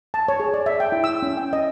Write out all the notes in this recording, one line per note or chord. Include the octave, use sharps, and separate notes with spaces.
A5
C#5
G#4
D5
E5
G5
E4
E6
C#4
G5
D#5